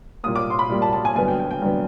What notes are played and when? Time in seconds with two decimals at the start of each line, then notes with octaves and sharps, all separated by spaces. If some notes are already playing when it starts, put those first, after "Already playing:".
0.23 A#2 G3 A#3 D#6
0.36 D6
0.50 C6
0.59 B5
0.69 A#2 G3 A#3
0.82 A5
0.93 A5
1.05 G#5
1.15 G2 D3 F#3 B3 G#5
1.28 G5
1.39 G5
1.51 G5
1.62 G2 D3 F#3 B3